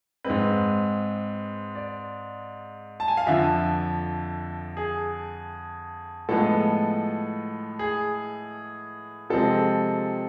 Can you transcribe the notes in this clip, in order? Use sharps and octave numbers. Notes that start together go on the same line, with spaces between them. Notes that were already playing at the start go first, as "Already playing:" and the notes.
G#2 G#3 C4 B4
D5
A5
G#5
F5
F2 D3 F3 E5
G#4
A2 F3 G#3 B3 A4
G#4
C3 F3 G#3 C4 A4